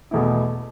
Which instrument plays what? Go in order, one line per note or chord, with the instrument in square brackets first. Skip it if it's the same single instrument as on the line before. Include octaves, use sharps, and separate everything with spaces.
[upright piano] E2 B2 A3 E4